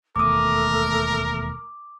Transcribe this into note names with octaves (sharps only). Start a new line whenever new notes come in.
E1 D#2 A3 A#4 D6 D#6